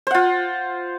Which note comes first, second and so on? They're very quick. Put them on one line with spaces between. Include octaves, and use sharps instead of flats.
C5 F#5 F4